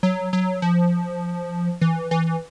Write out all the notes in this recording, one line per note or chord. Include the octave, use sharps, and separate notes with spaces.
F#3
F#3
F3
E3
E3